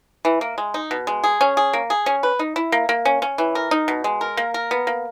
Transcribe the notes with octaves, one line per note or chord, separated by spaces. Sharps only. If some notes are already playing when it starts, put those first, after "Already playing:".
E3
A#3
G#3
D#4
B2
G#3
G#4
C#4
G#4
A#3
G#4
C#4
B4
D#4
E4
A#3
A#3
C#4
C#4
E3
A#4
D#4
B2
G#3
A#4
A#3
A#4
B3
A#3